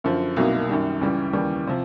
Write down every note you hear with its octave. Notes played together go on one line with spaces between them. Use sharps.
F#2 D3 F3
C2 B2 F#3 A#3 D#4
F#2 D#3 G3
C#2 C#3 E3 G3
D#2 C#3 E3 G3
C3 F3